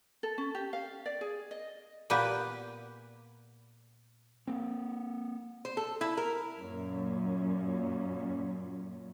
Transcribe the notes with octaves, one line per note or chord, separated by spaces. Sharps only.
A4
C#4
G4
F5
D5
G#4
D#5
A#2 A#3 B3 G4 B4
A#3 C4
C5
A4
E4
A#4
F#2 A#2 C#4